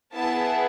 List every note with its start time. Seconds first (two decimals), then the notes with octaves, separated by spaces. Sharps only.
0.13 B3 E4 G#4 A5